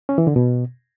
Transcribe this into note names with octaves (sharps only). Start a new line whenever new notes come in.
C#4
E3
D3
B2